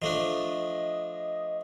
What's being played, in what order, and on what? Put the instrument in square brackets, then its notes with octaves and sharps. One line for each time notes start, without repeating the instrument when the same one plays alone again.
[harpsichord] F3 A3 D4 [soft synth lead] D#5